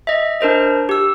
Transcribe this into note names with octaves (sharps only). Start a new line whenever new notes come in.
D#5 E5
D4 A#4 C5 D#5
G4 E6